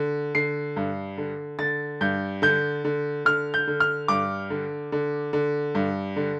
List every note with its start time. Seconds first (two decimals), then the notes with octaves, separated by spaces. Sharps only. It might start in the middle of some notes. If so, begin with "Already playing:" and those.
Already playing: D3
0.35 D3 C7
0.76 G2
1.18 D3
1.59 D3 A6
2.01 G2 G6
2.42 D3 G6
2.85 D3
3.25 D3 F6
3.54 G6
3.67 D3
3.80 F6
4.08 G2 D6
4.50 D3
4.92 D3
5.33 D3
5.75 G2
6.16 D3